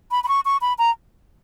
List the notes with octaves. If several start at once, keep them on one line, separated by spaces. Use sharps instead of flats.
B5
B5
C#6
C#6
B5
A#5